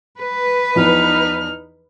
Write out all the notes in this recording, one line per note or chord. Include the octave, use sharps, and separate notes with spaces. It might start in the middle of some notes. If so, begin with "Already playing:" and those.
B4
E2 E3 F3 D#4 F6